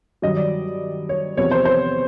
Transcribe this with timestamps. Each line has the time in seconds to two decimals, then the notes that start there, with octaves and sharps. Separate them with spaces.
0.22 G2 D#3 F#3 D#5
0.37 D5
1.09 C#5
1.37 E2 C3 F3 C#5
1.51 C5
1.65 C5